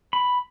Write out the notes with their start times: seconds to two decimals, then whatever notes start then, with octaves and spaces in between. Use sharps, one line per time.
0.13 B5